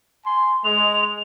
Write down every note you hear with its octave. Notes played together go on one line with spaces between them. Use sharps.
G#5 C6
G#3 F7